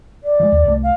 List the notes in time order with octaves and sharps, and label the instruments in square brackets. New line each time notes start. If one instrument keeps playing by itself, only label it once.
[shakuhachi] D5
[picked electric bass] F3 G#3
D#2
C2 A3
[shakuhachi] F5